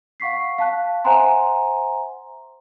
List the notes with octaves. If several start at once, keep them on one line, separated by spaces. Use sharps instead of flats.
F5 F#5 C#6 B6 C7
F5 A5 F#6
C5 E5 F#5 G#5 A#5 C6